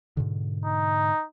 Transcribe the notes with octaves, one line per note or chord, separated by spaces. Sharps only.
G#2 B2 D3
D#4